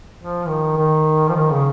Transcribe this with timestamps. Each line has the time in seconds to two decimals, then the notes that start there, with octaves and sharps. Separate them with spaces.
0.18 F3
0.47 D#3
0.77 D#3
1.29 F3
1.36 D#3
1.51 C#3